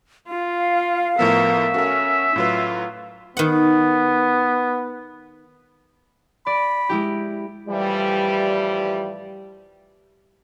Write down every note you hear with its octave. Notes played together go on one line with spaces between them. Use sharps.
F4 F5
A2 F3 B3 A#4 E5
C#4 F#4 A4 A#4
A2 F#3 F4 B4
D#3 B3 F#5
D5 B5
G#3 E4 G4
A2 E3 F3 G3